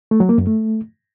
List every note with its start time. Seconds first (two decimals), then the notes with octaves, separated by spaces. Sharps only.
0.11 A3
0.20 F#3
0.29 A#3
0.38 F#2
0.47 A3